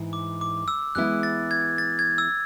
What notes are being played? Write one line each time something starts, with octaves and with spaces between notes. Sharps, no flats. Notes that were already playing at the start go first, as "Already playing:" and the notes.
Already playing: G#2 E3
D6
D6
E6
E3 G#3 B3 E4 F#6
A6
G#6
A6
G#6
E6